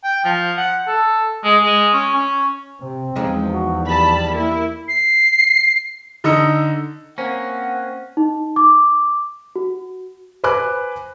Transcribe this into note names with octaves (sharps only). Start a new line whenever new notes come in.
G5
F3
F#5
A4
G#3
G#3
C#4
C#4
C3 C4
E2 F3 G#3 D#4
F#4
G3 A5 B5
A#3 E4
C7
D3 D#4 D#5 E6 C#7
A#3 C4 C#4 F#5
D#4
D6
F#4
B4 C5 G#5 D6 F#6